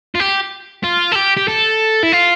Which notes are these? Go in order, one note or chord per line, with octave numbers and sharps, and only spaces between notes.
F4
G4
F4
A4
G4
G4
A4
E4
F4